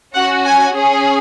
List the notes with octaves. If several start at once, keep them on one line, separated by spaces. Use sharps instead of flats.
C#4 F#4 F#5
G#5
C#4 G#4